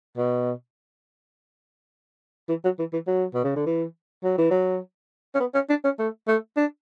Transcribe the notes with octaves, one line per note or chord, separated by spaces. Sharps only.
B2
E3
F#3
E3
E3
F#3
B2
C#3
D3
E3
F#3
E3
F#3
C#4
B3
C#4
D4
C#4
A3
A3
D4